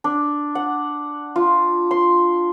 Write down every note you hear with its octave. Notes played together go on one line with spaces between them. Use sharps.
D4
F#5
F4
C6